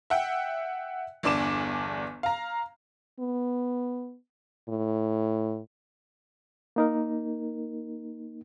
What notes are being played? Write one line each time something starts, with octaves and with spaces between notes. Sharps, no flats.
E5 F#5 G5
G1 E2 D4 D6 E7
F5 A#5
B3
A2
A#3 D#4 A#4